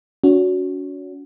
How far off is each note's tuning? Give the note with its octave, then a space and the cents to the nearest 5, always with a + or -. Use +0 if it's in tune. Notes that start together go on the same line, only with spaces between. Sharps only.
C#4 +35 F#4 -10